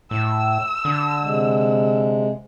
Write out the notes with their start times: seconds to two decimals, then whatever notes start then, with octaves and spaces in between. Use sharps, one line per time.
0.11 A2 E6
0.85 D3
1.23 C3 G#3